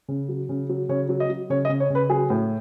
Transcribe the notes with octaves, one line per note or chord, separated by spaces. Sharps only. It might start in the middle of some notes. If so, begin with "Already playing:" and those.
C#3
F#3
C#3
F#3
C#3 C#5
F#3
D#5
F#3
C#3 C#5
D#5
C#3
C#5
C#3 B4
F#3 G#4
A2